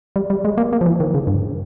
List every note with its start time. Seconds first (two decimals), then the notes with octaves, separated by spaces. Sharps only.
0.16 G3
0.30 G3
0.45 G#3
0.58 A#3
0.73 A#3
0.81 F3
0.86 E3
1.00 D#3
1.14 C#3
1.27 G2